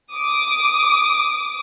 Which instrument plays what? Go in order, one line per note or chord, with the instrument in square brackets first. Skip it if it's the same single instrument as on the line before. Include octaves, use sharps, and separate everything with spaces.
[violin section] D6 D#6